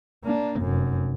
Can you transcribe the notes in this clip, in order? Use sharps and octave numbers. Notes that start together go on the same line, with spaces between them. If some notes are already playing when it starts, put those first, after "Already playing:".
A#3 D4
F1 F#2